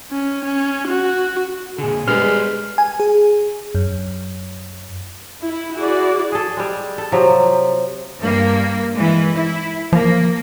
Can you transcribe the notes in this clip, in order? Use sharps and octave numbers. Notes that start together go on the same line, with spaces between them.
C#4
C#4
F#4
A#2 D3 G#4
G3 G#3 B3 A4 B4 C5 F6
G#5
G#4
F#2
E4
E4 F#4 G#4 D5
G#4 A4
G3 G#3
A4
C3 F3 F#3
G2 A#3
E3 G#3
E4
F3 A#3